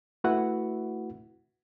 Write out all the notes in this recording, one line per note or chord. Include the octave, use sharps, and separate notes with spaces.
A3 E4 F#4 B4 E5 F#5